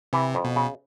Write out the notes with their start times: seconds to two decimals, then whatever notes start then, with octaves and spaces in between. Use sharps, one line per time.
0.13 C3 E3
0.35 F2
0.44 B2
0.56 C#3